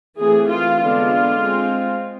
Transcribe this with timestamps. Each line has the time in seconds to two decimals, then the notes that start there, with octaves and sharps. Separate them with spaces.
0.18 E3 A3 C4 G#4
0.49 F4
0.79 D3 G#3 B3 D4 F4
1.40 G#3 C4